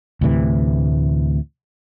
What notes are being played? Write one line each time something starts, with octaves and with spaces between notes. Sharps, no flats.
D2 A2 C3 E3